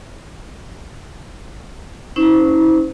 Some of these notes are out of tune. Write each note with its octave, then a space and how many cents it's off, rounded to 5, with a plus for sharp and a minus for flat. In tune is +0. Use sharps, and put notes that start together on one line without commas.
C#4 +0 E4 -35 C5 -25